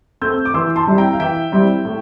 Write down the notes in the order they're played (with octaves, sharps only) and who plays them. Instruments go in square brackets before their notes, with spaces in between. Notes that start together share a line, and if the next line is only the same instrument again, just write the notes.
[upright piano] A3 C4 E6 G6
D6
E3 C6 E6
A5 C6
G3 C4 E4
G5 A#5
F5
E3 E5 G5
G3 C4 E4
A2